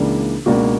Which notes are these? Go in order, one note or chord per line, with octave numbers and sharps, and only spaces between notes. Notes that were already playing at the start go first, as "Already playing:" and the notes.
Already playing: C#2 C#3 E3 A#3 D4
C#2 B2 A#3 D4 F#4